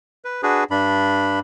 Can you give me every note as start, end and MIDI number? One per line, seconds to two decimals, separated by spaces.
0.25 0.43 71
0.43 0.64 62
0.43 0.64 66
0.43 0.64 68
0.43 0.64 71
0.71 1.39 43
0.71 1.39 62
0.71 1.39 83